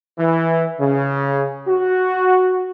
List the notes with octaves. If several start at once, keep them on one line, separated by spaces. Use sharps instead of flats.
E3
C#3
F#4